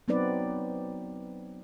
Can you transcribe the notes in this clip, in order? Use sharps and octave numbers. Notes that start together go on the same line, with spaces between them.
F#3 B3 C4 D#4 B4 D5